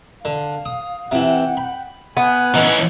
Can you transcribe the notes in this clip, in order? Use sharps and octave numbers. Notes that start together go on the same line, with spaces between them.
D3 F5
D#6
C3 E3 F#5 G5
B5
B3 G#5 F#6
E3 C#4 D#4